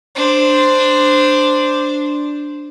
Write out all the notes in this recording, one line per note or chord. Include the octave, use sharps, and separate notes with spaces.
D4 C5